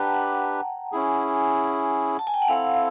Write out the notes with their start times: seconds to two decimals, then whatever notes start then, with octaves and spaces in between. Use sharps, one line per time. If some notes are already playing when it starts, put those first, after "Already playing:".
Already playing: D4 G4 B4 F#5 G5 A5 A#5
0.14 F#5
0.92 C#4 E4 G#4
2.19 A5
2.27 G#5
2.34 G5
2.42 F#5
2.48 C4 E4 A4 F5
2.74 F5